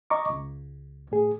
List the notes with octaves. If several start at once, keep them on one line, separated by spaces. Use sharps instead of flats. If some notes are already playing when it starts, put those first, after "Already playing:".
D#5 A#5 C#6 D6
C#2
A2 G#4